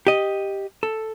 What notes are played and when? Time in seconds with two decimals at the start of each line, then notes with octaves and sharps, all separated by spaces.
0.07 G4 D#5
0.83 A4